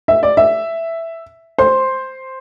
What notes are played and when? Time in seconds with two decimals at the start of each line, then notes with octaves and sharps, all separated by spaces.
0.08 E5
0.23 D5
0.37 E5
1.58 C5 C6